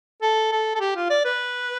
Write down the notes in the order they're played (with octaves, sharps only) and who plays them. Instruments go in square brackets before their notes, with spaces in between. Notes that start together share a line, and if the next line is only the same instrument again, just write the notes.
[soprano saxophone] A4
A4
A4
G4
F4
D5
B4